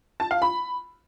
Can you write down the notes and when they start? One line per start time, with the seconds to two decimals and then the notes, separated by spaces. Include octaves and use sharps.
0.20 A5
0.31 F5
0.42 B5